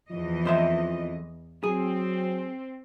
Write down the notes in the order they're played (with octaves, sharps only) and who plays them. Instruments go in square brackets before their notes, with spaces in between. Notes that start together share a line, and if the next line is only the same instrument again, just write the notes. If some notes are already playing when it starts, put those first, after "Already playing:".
[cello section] E2 E3 D#5 [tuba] F3
[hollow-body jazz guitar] F2 C5 E5
[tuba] F#3 [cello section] C4 [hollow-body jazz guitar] G#4